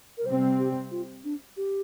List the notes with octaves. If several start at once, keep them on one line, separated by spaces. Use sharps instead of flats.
A#4
C3 G3 C4 C5
G4
F4
D4
G4